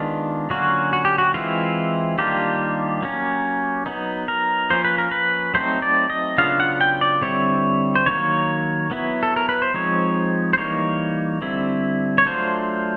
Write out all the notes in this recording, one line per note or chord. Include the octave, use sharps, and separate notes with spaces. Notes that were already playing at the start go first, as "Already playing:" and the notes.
Already playing: D#3 G#3 B3 D4 F4
D3 F#3 A#3 C#4 F4 F#4
F#4
G4
F#4
E3 G#3 C4 E4 F4
D#3 G3 A#3 D4 F4 G4
F#3 A#3 C#4
F#3 B3 D#4
A#4
F3 A#3 C#4 F4 C5
B4
A#4
B4
F#3 A3 C4 D#4 C5
D5
D#5
C#3 F#3 B3 D4 F4 F5
F#5
G5
D5
D3 G3 C4 E4 C#5
C5
D#3 F#3 A#3 C#5
F#3 B3 E4
A4
A#4
B4
C5
F3 G#3 C4 D#4 C#5
C5
E3 G3 A#3 D#4 C#5
D3 G3 C4 E4
C#5
F#3 A3 D4 F4 C5